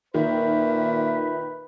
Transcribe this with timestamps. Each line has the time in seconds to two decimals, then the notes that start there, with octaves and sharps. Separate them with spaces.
0.14 A#2 D#3 B4 E5